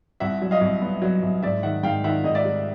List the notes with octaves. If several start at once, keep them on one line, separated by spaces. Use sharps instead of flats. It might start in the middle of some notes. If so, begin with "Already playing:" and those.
C2 E5 F#5
F#3
D#5 F5
C2
B3
F#3
C2
G#2 D5 E5
D#3 E5 F#5
G#2 F5 G5
D#3 E5 F#5
G#2 D#5
D5 E5
G3